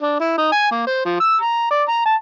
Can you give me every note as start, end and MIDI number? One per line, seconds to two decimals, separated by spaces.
0.01 0.16 62
0.20 0.33 64
0.38 0.52 63
0.52 0.70 80
0.71 0.83 58
0.87 1.02 72
1.05 1.19 53
1.20 1.36 88
1.41 1.71 82
1.71 1.83 74
1.88 2.01 82
2.06 2.15 81